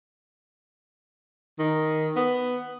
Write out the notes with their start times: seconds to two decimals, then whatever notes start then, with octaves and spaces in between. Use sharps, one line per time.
1.59 D#3
2.16 B3